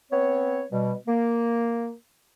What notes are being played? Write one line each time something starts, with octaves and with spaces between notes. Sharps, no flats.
B3 C4 C#5
B2 G3
A#3